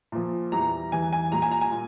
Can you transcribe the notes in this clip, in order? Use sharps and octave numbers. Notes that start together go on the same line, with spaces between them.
A#2 F3
E2 E3 G3 A#5
E2 E3 G3 G#5
G#5
A#2 G3 A#5
G#5
A#5
G#5
A#2